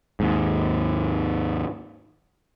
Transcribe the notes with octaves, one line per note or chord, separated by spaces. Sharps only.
D#2 G#2